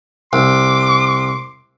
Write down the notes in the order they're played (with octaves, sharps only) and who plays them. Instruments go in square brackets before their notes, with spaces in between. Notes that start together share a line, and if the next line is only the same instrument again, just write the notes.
[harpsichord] C2 [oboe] C6 [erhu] D6